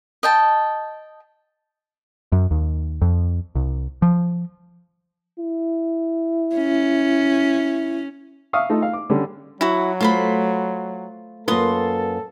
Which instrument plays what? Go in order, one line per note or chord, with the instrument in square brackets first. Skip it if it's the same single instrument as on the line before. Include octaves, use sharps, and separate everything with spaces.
[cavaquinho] D#5 G5 A5
[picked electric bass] F#2
D#2
F2
C2
F3
[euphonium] E4
[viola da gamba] C#4
[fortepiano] E5 F5 C#6 D#6 F6
A3 D#4 F4 A4
F5
D6
D3 G3 C#4
[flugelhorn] F#3 [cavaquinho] E4 F#4
[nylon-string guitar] A3 [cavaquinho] F4 C5 B5
[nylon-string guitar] F#2 A#3 B4 [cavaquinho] F4 C6 D#6 [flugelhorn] A4